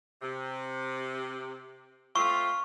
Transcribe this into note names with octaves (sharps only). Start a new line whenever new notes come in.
C3
A3 C4 F4 C#6